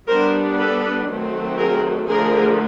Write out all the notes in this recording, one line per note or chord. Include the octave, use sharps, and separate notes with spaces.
G3 B3 D4 A#4 C5
A4 B4
D#3 F#3 A3 C4
G#4 A#4
D3 F3 A3 G#4 A#4